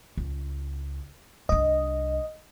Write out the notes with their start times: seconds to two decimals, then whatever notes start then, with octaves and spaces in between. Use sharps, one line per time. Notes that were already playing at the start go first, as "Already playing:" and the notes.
0.17 C#2
1.49 C2 D4 D#5